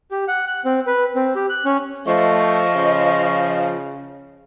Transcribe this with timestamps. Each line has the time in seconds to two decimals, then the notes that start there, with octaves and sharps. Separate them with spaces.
0.11 G4
0.28 F#5
0.47 F#6
0.65 C4
0.87 B4
1.15 C4
1.35 G4
1.49 F#6
1.65 C#4
2.06 F3 A3 D#5 C#6
2.75 C#3